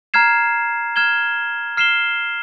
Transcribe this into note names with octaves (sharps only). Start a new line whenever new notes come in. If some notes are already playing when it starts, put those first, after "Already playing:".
A#5 F6 G#6 C7 E7
F6 G#6 E7 G7
F6 C7 E7 G7